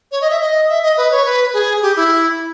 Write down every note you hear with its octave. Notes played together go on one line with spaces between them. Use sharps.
C#5
D#5
E5
D#5
E5
D#5
B4
C#5
B4
G#4
G4
E4